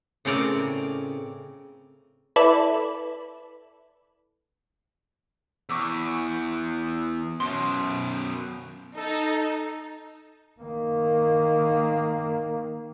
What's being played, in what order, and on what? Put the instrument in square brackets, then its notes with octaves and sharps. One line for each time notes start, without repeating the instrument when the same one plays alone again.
[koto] A2 C#3 C4 A#4 D5
[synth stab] E4 A4 B4 D5
[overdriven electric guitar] E2 [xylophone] C#6 D6 E6
[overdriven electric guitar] F#2 B2 [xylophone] C6
[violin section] D#4 [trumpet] A4
[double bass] D#3 A#3